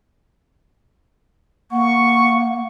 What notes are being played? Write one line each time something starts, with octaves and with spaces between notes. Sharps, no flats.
A#3 F#5 C#6